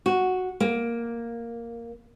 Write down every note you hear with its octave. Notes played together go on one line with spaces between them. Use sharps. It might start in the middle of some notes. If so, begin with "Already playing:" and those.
F#4
A#3